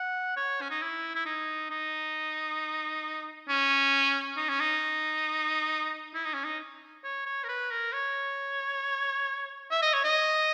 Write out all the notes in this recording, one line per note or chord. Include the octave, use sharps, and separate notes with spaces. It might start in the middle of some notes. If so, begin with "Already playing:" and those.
Already playing: F#5
C#5
C#4
D#4
E4
E4
D#4
D#4
C#4
D#4
C#4
D#4
E4
D#4
C#4
D#4
C#5
C#5
A#4
B4
A#4
C#5
E5
D#5
C#5
D#5